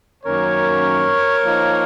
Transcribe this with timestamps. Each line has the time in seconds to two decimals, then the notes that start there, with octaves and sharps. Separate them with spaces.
0.24 F#2 D#3 A#3 C#4 A#4 C#5
1.44 F3 A#3 D#4